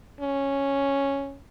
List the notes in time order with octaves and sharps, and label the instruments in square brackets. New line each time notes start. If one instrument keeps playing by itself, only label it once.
[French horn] C#4